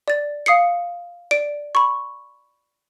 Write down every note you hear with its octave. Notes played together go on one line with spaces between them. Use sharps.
D5 A6
F5 D#6 C7 C#7
D5 D7
B5 C#6